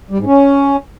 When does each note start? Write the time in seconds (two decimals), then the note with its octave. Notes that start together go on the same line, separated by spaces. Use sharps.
0.11 G3
0.18 G#2
0.26 C#4